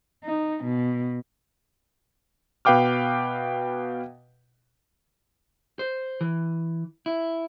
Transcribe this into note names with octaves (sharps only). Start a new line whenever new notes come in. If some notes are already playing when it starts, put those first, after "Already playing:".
D#4
B2
B2 B4 F5 G5 D6 F6
C5
E3
E4